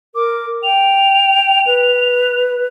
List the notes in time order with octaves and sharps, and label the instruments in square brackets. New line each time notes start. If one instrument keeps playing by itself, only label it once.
[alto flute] A#4 [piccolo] D6
[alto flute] G5 [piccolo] F7
[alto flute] B4